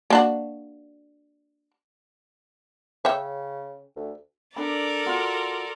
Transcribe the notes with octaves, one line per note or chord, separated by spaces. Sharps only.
A#3 D4 F#4
C#3 C#5 E5 G5
D2
D4 A4 A#4 D5 B5
F4 F#4 C6